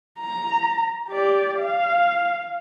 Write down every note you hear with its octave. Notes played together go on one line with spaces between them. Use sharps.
A#5
G4 D5
F5